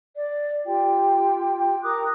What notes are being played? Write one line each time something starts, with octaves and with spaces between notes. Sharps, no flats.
D5
F4 G4 G5
A#4 D6 D#6 F#6